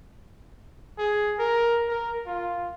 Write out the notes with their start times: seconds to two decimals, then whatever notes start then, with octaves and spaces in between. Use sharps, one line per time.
0.98 G#4
1.38 A#4
1.88 A#4
2.26 F4